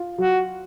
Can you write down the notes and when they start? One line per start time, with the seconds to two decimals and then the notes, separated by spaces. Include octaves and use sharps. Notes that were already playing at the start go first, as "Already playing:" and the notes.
Already playing: F4
0.18 F#3 F#4